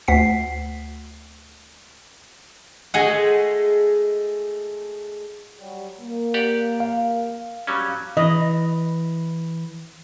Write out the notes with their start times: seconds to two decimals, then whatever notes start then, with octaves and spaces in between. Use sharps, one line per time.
0.08 D2 F#5 B6 C7
2.94 G#3 A3 G#4 D#5 F#5
5.59 F#3 G3
6.01 A#3
6.34 G4 D5 F#5
6.80 F5
7.67 F#3 G3 C#4
8.17 E3 D#5